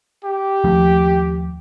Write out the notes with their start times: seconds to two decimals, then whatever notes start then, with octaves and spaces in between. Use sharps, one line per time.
0.24 G4
0.64 D#2 F3 A3